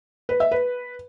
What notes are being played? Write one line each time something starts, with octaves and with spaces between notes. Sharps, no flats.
B4
E5
B4